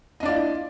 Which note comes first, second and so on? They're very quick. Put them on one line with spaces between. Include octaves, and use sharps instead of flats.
D#5 D4 D5 F4 E4